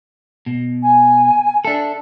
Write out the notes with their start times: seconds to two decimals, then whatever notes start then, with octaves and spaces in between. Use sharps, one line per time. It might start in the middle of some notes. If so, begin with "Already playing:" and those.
0.46 B2
0.82 G#5
1.65 D4 A4 E5